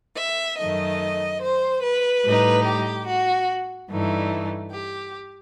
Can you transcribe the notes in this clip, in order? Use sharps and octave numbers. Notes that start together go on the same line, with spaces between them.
E5
F#2 D#3 A3 D#5
C5
B4
A2 G3 D#4
G4
F#4
G2 E3 A3 D#4
G4